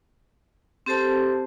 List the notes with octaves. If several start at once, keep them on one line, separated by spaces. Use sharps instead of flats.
C4 G4 A4 C5 A5